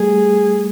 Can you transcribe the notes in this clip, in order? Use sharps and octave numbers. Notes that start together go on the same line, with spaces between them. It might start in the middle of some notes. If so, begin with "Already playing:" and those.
Already playing: G3 A3 G#4